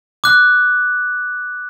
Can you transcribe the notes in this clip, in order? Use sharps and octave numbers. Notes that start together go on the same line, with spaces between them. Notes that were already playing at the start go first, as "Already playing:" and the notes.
D6 F#6